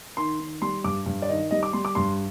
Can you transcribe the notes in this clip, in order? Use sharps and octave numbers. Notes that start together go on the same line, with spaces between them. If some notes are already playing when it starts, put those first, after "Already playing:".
D#3 C6
D#3
G3 C6
G2 D6
G2
D5
D#3 D#5
G3 D#5
D6
G3 C6
D6
G2 C6